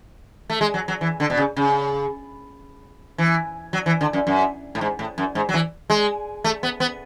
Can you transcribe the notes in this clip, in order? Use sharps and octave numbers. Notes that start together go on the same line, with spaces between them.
A3
G#3
F#3
F#3
E3
D3
B2
C#3
C#3
E3
F#3
E3
D3
F#2
F#2
A2
G#2
A2
F#2
G#2
F#3
E3
G#3
A3
B3
B3